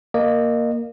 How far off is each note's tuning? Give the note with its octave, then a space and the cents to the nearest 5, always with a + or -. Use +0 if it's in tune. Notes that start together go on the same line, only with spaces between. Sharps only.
A#3 +0 D#5 -30